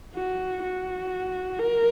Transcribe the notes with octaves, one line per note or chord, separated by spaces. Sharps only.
F#4
F#4
A#4